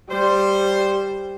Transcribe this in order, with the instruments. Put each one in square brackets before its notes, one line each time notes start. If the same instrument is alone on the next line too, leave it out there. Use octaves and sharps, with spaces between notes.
[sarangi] G3 [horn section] C5